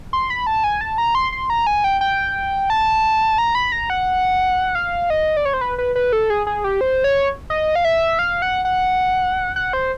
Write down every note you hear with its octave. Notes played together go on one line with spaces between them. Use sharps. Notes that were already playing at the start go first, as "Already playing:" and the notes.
C6
B5
A5
G#5
A5
A#5
C6
C6
A#5
G#5
G5
G5
A5
A#5
B5
A#5
F#5
F5
D#5
D5
C#5
C5
B4
B4
B4
A4
G#4
G#4
G4
C5
C#5
D#5
F5
E5
F5
F#5
F#5
F#5
C5